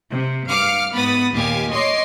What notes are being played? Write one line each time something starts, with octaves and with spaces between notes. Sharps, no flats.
C3
G2 F5 D6 F6 C#7
G#2 B3 B5 D#6 A6
D#2 A#2 G4 F5 G#5
C#5 D#5 C6 D6 C7